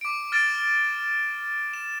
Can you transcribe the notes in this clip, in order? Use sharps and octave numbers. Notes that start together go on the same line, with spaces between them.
D6 D7
F6 A6 D7 E7
E7